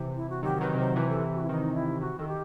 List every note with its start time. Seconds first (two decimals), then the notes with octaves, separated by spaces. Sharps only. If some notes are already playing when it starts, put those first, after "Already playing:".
Already playing: C3 E3
0.16 E4
0.30 F#4
0.43 D#3 F#3 G4
0.61 D#3 F#3 B4
0.75 C3
0.78 D#3 C5
0.96 C3 E3 B4
1.09 A4
1.35 F#4
1.43 E4
1.49 D#3 D#4
1.75 E4
2.01 C3 F#4
2.19 D#3 A4
2.28 G4